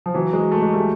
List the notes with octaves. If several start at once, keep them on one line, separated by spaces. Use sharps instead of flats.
F3
E3 F#3
F#3 G#3
A3
G#3
G3 A3